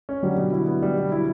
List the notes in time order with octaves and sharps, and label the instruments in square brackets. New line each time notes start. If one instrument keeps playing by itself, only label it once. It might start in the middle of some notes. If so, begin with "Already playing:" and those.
[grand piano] C#4
[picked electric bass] D3 F#3 [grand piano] G3
[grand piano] B2
E4
B3
G3
B2
E4